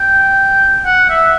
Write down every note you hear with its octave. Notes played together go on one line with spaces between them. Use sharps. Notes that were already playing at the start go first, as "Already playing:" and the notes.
Already playing: G5
F#5
E5